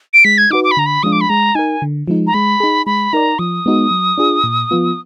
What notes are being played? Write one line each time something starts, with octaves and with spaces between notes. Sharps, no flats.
D7
G#3 B6
G#6
D#4 F#4 B4 D6
D6
B5
D3 A#5
B5
F3 G#3 D4 F4 D#6
D6
B5
G#3 A#5
D#4 A#4 G#5
D3
F3 G#3 D#4
A#5
G#3 B5
D#4 G#4
G#3 B5
D#4 A#4 D5 A#5
F3 D#6
G#3 B3 D#4 F#4
F#3
D4 F4 G#4
A#2
F3 B3 F4